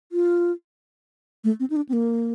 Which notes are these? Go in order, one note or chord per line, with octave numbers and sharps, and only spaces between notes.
F4
A3
C4
D#4
D4
C4
A#3